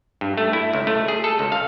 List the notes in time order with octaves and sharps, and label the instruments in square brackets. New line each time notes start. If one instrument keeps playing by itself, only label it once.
[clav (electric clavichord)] G2
A3
E4
C#2
A3
G#4
A4
C#2
F5